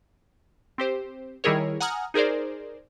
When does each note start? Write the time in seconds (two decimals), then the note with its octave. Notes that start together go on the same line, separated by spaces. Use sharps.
0.78 C4 G4 C5
1.44 D#3 G3 E4 G#4 A#4 C#5
1.80 F#5 G#5 A#5 D#6 F6
2.14 D#4 G#4 A#4 C5 D5